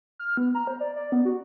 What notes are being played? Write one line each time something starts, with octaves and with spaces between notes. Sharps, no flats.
F6
B3
A#5
C5
D5
D5
B3
F#4